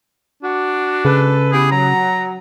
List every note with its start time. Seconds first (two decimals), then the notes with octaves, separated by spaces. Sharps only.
0.43 D4 F#4
1.05 C#3 G#3 A4 B4
1.52 B3 E4 G4 G#4
1.71 F#3 A#5